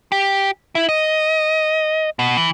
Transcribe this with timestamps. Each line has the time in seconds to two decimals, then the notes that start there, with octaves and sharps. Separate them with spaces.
0.12 G4
0.75 E4
0.89 D#5
2.19 B2
2.37 E3